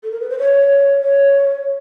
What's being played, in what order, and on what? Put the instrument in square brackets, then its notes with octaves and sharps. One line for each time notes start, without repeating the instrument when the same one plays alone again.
[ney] A4
A#4
B4
C5
C#5
C#5